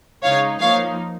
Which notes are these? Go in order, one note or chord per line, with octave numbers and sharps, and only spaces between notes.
C#3 G#3 D#4 C#5 F5
F3 A#3 D#4 C#5 F5